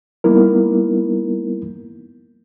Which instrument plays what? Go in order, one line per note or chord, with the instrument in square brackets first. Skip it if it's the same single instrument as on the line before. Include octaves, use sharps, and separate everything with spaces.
[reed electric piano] G3 A#3 B3 D#4 E4 A#4